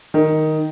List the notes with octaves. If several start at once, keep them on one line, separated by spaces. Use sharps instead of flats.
D#3